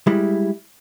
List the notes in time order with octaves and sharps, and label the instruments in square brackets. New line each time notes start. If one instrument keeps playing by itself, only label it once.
[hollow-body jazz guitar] G3 G#3 E4